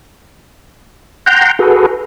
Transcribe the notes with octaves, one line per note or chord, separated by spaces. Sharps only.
F#5 G5 A#5 C6
F#4 G#4 A4 B4